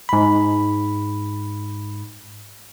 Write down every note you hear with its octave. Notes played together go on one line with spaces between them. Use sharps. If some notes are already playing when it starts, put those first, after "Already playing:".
G#2 B5